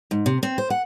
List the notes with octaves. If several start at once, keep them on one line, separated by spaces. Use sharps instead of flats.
G#2
C3
C4
C5
F#5